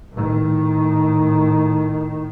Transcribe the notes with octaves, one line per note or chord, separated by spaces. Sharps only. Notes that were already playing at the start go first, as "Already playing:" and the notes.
A2 D#3